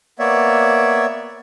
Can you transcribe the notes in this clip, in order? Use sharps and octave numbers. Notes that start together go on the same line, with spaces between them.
A#3 B3 C#5 D5 E5